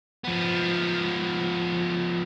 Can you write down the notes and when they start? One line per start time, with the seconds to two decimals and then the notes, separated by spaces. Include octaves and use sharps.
0.25 F3 B3